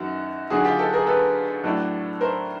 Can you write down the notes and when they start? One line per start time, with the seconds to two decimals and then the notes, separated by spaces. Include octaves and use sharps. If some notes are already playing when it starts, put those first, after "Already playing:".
Already playing: F#2 D#3 F#3 F#4
0.50 D#2 D3 F#3 F#4 G#4
0.64 F4 G4
0.79 G4 A4
0.93 G#4 A#4
1.07 A4 B4
1.63 A2 F#3 A3 D4
2.21 A#4 C5